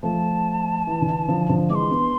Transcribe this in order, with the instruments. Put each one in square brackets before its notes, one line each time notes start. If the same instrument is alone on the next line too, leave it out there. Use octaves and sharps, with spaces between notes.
[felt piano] F3 A3 [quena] A5
[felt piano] E3
D3
E3
D3 F3
D3 F3
[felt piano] E3 G#3 [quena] D6
[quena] C6
[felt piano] B3 D4